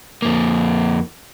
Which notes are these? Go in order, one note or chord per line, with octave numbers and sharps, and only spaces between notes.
F2 A#3